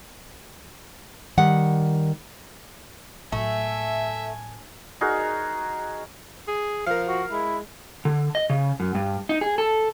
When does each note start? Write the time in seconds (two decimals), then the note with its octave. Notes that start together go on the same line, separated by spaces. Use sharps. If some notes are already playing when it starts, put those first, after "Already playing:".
1.37 D#3 G3 F#5
3.32 A2 F#3 A3 E5 G#5
5.01 D#4 F#4 G#4 A#4
6.47 G#4
6.86 F3 A#4 F5
7.08 F#4
7.31 G#3 E4
8.05 D3
8.35 D#5
8.50 C#3
8.80 F#2
8.95 G2
9.29 D#4
9.41 G#4
9.58 A4